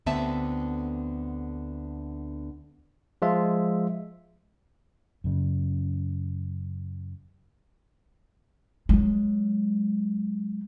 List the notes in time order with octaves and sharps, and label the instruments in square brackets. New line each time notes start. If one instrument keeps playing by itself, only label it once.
[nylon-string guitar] D2 D3 B3 C4 E5 A5
[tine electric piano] F3 G#3 F4 E5
[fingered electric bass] F#2 C#3
[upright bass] F#3 G#3